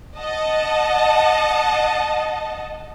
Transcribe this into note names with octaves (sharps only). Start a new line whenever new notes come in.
D#5 F#5 A5